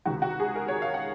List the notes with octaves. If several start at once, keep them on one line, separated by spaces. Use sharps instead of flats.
C#2 C3 D#3 F#4
F#4
G#4
A#4
C#5
F5
F#5